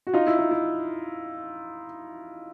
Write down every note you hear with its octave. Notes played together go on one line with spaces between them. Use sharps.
F#4
D#4 F4
E4
D#4
E4